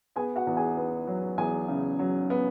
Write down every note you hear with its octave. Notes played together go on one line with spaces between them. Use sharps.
B3 G#4 G#5
F#4 F#5
E2
G#4 G#5
B3
F#3
E2 G#4 G#5
C#3
F#3
B3